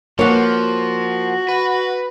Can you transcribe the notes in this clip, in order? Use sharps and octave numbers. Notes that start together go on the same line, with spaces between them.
F3 A#3 F#4 C#5 F#5
B4